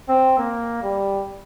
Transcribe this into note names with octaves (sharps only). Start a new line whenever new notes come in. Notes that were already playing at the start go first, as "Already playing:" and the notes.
C4
A#3
G3